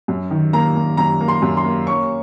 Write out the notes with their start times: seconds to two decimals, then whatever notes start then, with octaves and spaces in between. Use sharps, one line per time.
0.08 F#2
0.31 D#3
0.53 A#3 A#5
0.76 A#3
0.97 F#2 A#5
1.21 A#3
1.28 C6
1.42 F#2
1.57 C6
1.65 A#3
1.87 C#4 C#6